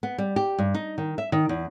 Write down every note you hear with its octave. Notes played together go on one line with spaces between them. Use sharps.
B3
G3
G4
G2
D#4
D#3
E5
D#3
E2